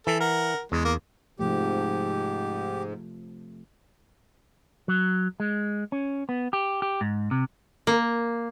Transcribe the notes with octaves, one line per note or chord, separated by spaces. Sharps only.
E3 A4
A#4 F#5
E2 G#3
A#3
G#2 C3 F3 A3 G4
F#3
G#3
C#4
B3
G4
G4
G#2
C3
A#3